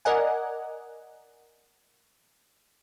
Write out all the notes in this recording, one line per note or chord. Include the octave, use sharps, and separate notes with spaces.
A#4 D5 D#5 F#5 G#5